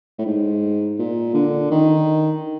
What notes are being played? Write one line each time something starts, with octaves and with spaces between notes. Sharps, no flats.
A2
G#2
A#2
D3
D#3